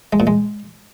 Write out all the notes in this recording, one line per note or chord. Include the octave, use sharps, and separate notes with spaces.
G#3
A#2
G#3